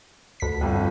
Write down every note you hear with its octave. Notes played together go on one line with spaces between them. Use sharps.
D2 B6
G1 F2